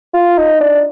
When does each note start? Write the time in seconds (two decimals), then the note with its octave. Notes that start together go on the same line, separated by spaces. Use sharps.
0.14 F4
0.38 D#4
0.61 D4